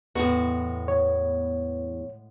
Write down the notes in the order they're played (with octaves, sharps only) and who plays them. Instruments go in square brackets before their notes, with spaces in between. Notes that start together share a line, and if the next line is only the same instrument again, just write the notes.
[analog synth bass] E2 [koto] A2 G#3 F#4 [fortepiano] B3
[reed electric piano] C#5